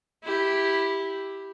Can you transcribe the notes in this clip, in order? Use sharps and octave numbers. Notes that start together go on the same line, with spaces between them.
E4 G4